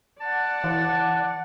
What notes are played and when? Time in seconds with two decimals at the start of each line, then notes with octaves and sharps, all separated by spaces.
0.21 D5 F#5 A5
0.64 E3